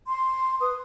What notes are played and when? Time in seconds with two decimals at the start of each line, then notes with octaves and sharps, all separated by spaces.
0.07 C6
0.60 B4 D#6